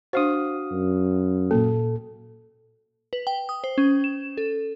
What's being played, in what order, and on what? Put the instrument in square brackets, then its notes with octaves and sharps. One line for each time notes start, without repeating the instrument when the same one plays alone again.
[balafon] D4 C5 [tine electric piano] F#4 F5 D#6
[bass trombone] F#2
[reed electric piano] A#2 A4 [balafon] A#3
[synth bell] B4
G5
D#6
C5
C#4
E7
A4